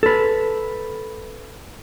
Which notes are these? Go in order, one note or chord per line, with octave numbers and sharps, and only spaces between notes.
A4 B4